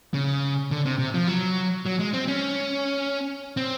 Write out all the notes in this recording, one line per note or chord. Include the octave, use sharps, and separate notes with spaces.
C#3
D3
C3
C3
F3
F#3
F#3
G#3
C4
C#4
C4